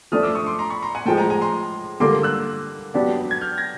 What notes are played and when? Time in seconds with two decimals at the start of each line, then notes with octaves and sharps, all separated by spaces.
0.12 F3 A3 D4 D#6 F6
0.23 D6 E6
0.35 C#6 D#6
0.46 C6 D6
0.59 A#5 C6
0.70 B5 C#6
0.83 A#5 C6
0.95 F#5 G#5
1.06 A2 F3 G#3 G5 A5
1.17 G#5 A#5
1.30 G#5 A#5
1.41 A#5 C6
2.00 D3 G3 A#3 C6 D6
2.23 E6 F#6
2.94 F#3 B3 D4 G4
3.31 G#6
3.41 F6 G6
3.58 G#6 A#6